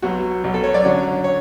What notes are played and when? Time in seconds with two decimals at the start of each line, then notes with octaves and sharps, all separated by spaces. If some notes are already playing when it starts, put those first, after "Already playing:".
0.02 B1 B2 F#3 F#4
0.44 B1 B2 F#3
0.54 A4
0.64 C#5
0.74 D5
0.84 F#2 D3 F#3 C#5
1.24 C#5